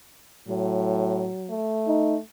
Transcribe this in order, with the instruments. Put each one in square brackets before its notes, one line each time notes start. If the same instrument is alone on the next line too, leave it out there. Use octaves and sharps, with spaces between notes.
[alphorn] A2 [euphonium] F#3
[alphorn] A3
[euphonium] D#4